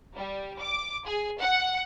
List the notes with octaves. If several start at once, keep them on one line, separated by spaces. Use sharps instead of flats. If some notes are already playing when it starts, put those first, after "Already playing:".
G3
D6
G#4
F#5